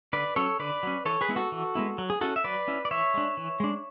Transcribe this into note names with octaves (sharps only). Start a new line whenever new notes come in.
D3 B4 D5
F#3 C#4 A4 C#5
D3 B4 D5
F#3 C#4
E3 A4 C#5
G#4 B4
G#3 B3 E4
F#4 A4
E3
G#3 B3 E4
F#3
G#4
C#4 E4 F#4 A4
E5
F#3 B4 D5
C#4 E4
D5
E3 C#5 E5
G#3 D4
E3
G#3 D4